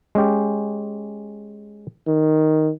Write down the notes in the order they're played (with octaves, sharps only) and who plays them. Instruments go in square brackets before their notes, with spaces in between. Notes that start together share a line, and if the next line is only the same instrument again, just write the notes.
[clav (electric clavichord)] G#3 C#4 G4
[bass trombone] D#3